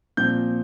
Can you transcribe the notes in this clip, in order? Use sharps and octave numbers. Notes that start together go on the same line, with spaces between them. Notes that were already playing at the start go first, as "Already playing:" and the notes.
A#2 F3 C4 G6